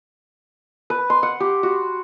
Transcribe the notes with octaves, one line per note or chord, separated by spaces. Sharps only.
B4
C6
F#5
G4
F#4